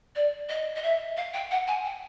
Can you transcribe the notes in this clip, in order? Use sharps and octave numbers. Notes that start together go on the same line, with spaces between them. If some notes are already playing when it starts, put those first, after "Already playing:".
D5
D#5
D#5
E5
F5
G5
F#5
G#5
G5